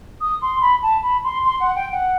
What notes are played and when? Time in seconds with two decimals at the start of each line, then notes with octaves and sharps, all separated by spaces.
0.21 D#6
0.41 C6
0.61 B5
0.83 A5
1.03 B5
1.24 C6
1.44 C6
1.60 F#5
1.75 G5
1.91 F#5